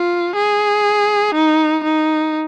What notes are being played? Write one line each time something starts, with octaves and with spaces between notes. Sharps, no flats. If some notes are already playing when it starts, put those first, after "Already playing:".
Already playing: F4
G#4
D#4
D#4